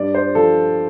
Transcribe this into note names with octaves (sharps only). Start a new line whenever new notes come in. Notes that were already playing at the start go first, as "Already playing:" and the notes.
Already playing: G2 D5
C5
F3 A4